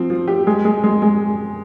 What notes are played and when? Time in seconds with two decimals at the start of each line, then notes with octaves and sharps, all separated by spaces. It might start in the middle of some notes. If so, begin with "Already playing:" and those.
Already playing: F3 C4
0.10 F3
0.28 G4
0.47 G#3
0.65 G#3
0.84 G#3
1.02 G#3